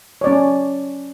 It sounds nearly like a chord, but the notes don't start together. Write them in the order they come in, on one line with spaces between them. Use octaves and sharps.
C#5 D5 C#4